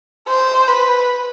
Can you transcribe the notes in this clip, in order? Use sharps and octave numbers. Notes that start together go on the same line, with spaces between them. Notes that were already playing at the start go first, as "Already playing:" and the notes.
C5
B4